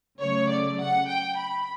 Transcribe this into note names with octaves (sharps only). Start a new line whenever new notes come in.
C#3 F#3 A3 C#5
D5
F#5
G5
B5